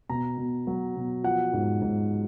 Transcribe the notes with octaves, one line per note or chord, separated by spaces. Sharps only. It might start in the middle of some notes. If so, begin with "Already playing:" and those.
B2 A#5
B2
F#3
B2
F3 F#5
G#2
G#2